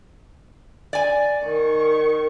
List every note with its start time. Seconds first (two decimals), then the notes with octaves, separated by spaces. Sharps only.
0.93 D5 G#5
1.45 D#3 C#6